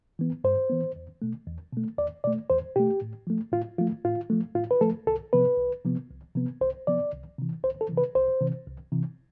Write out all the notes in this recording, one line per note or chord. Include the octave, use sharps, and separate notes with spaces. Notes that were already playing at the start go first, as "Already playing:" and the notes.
E3 B3
G2 C5
E3 B3
E2
B2 A3
E2
B2 A3
E2 D5
B2 A3 D5
E2 C5
B2 A3 G4
A2
F3 A3
A2 F4
F3 A3 F4
A2 F4
F3 A3
A2 F4
B4
F3 A3 A4
C2 A4
C3 F3 B3 B4
C2
C3 F3 B3
C2
C3 F3 B3
C2 C5
C3 F3 B3 D5
C2
C3 E3
C2 C5
A4
C3 E3
B4
C2 C5
C3 E3
C2
C3 E3